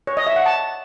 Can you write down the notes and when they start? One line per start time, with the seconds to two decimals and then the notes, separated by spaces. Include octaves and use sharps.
0.07 C#5
0.17 D#5
0.27 E5
0.36 F#5
0.46 A5